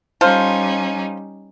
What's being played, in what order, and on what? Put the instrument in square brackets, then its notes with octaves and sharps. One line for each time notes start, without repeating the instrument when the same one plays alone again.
[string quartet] G3 C#4 D#4 [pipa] F4 A4 C5